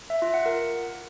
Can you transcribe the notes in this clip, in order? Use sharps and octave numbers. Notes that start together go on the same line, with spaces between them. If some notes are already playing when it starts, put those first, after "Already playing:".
E5
F4
F#5
A#4